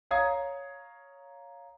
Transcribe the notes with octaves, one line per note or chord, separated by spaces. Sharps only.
C#5 F5 A#5 D#6 G#6 C7